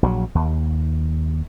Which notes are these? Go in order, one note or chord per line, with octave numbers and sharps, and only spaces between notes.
A#1 F3 F#3
D#2